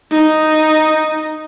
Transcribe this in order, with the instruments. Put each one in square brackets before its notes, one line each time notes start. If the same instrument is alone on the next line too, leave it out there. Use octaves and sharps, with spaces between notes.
[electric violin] D#4